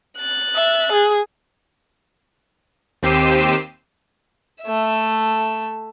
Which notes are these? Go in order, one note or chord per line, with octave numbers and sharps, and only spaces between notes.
F#6 A6
E5
G#4
D#2 C4 G4 C7 D#7 E7
A3 E5